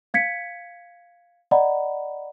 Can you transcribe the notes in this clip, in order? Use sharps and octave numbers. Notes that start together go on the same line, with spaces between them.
F5 G#6 B6 C#7
D5 D#5 F#5 A#5 B5